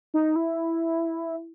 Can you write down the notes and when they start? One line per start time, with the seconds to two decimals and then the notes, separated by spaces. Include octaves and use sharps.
0.14 D#4
0.36 E4